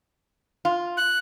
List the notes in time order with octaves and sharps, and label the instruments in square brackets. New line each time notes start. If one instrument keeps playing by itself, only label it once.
[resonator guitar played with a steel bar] F4
[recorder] F#6